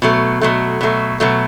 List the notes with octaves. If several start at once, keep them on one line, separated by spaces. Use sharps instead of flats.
B2 F#3 A3
B2 F#3 A3
B2 F#3 A3
B2 F#3 A3